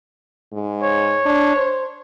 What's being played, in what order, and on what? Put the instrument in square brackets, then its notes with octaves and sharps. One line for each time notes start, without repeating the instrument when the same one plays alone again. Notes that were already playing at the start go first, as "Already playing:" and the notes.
[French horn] G#2
[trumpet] C#5
[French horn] D4
C5